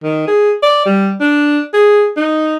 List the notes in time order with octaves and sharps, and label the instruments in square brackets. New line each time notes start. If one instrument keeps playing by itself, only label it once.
[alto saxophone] D#3
G#4
D5
G3
D4
G#4
D#4